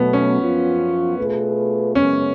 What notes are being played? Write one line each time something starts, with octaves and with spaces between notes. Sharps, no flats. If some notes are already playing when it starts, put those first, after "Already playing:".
Already playing: B2 F#3 A3 B3
C#4
F#2 F3 B3 F4
B2 A3 F4 G#4 B4
F#2 C#3 G#3 B3 C#4